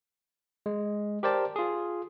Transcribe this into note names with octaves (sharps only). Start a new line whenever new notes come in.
G#3
G4 A#4 C5 D5 A5
F4 G#4